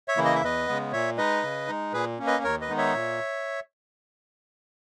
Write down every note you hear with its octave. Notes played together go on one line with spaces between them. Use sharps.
C#5 E5
C#3 E3 A#3 E4
D#5
E5
E2 B4 D#5
C#3 G#3 B3
A#2 C#5 E5
G#3 D#4 B4 D#5
C#3
G#3 D#4
A#2 G#4 B4
A#3 C#4
B4 D#5
D#2 A#4 C#5
B4 D#5
D#3 G#3 B3 D#4
C#5 E5
A#2